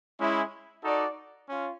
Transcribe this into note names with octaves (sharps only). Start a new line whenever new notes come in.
G#3 C#4 E4
D#4 F#4 A4 D5
C#4 F4